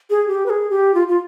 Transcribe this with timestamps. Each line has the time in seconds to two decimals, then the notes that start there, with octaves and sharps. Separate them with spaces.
0.10 G#4
0.28 G4
0.46 B4
0.50 G#4
0.70 G4
0.94 F4
1.08 F4